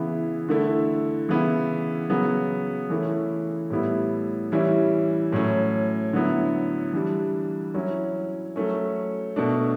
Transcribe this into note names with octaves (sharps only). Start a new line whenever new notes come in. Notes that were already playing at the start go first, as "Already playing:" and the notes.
Already playing: C#3 E3 B3 E4
D3 A3 E4
C#3 E3 B3 E4
C#3 F#3 B3
E3 A3 C#4 E4
A2 G3 B3 E4
E3 G3 C#4 E4
A2 F#3 C#4
D3 F#3 B3 E4
E3 G3 D4
F#3 C#4 E4
F#3 A3 C#4
B2 A3 D4